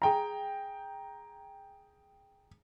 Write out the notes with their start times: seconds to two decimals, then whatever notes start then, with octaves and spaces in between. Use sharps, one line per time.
0.02 G#4 G5 A#5